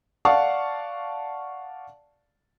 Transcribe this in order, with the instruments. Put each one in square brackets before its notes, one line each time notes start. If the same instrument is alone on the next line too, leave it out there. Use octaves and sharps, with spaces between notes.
[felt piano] D5 F5 F#5 A5 C#6